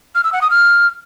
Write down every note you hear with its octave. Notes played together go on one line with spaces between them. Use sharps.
F6
E6
F#5
D#6
F6